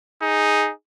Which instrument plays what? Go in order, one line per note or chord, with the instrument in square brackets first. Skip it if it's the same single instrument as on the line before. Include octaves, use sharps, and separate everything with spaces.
[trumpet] D#4 [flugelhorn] G#4